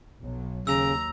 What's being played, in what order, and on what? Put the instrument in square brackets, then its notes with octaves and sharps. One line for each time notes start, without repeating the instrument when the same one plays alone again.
[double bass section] B1 F#3
[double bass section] D#2 [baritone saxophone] C#3 [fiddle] A#5 [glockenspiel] E6